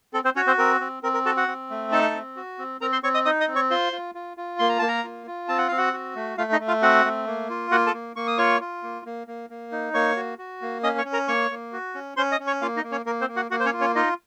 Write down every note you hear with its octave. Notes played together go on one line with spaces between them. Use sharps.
C4 A4
C4 C5
C#4 F#4 C#5
C4 C5
C4 A#4
C4
C4 A#4
A#4
F#4 A4 A5
F#4 F#5
C4
A3
D#4 A4 A5
C4
F#4
C4
C4 A#4 A#5
C5 C6
C4 C#5 C#6
D#5 D#6
D#4 D#5 D#6
D#5 D#6
C4
C#5 C#6
F4 C5 C6
F4
F4
F4
A#3 C6
A#5
A#3 A5
A#4 A#5
F4
F4
C4 A5
F#5
C4 F5
F#4 F#5
F#4
A3
A3 F4 F5
D#4 D#5
A3
F4 F5
C4 F#4 F#5
A3
A#3
F4
A#3 F#4 F#5
A4 A5
A#3
A#3 C#6
D#6
F4 C#5 C#6
F4
A#3
A#3
A#3
A#3
D#4
A#3 C#5 C#6
F#4
F#4
A#3
C#4 D#5 D#6
C#5 C#6
C#4
A#4 A#5
A#3 C#5 C#6
A#3
F#4
C#4
C#4 C5 C6
D#5 D#6
C#4
C#5 C#6
A#3 F4 F5
D#4 D#5
A#3
C#4 C#5
A#3 A#4
C4 C5
A#3
F#4 F#5
A#3 F#4 F#5
C5
C#4 C#5
F4
C#4 C#5
D#4 F4 D#5